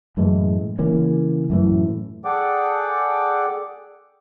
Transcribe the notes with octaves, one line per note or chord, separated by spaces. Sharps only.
F#2 A2 E3 G#3
C#3 E3 A#3 C#4
F#2 A2 E3
G#4 A4 D5 F#5 G5 D6